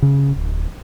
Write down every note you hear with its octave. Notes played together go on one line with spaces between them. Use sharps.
C#3
D1